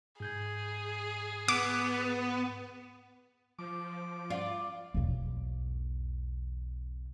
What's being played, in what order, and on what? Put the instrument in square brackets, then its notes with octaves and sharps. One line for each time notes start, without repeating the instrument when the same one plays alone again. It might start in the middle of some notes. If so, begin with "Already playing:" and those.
[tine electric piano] G#2 G6 G#6 [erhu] G#4
[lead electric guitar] B3 [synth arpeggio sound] D6
[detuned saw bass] F3 [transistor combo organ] D6
[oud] F4 [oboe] D5
[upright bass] B1 E2